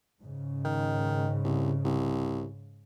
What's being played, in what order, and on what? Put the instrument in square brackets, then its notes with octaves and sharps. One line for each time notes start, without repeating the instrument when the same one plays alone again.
[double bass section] G#2 C#3
[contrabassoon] D#3
C2
C2